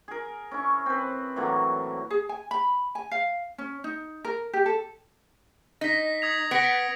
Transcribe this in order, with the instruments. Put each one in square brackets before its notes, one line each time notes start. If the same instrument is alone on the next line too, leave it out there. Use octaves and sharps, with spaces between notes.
[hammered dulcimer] G#4 A#4
C#4 E4 C#6
C4 B4
A2 E3 F#3 A#3
[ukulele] G#4
G#5
B5
G#5
F5
C#4
D#4
A#4
G4
A4
[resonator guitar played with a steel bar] D#4 [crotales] A#6 B6
[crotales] D#6 G#6 F7
[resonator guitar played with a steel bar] B3 [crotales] A#6 C#7 D7